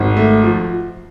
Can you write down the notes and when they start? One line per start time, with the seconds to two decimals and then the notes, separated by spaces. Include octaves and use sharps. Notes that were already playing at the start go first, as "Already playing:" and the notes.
Already playing: G#1 F#4
0.17 A3
0.44 F3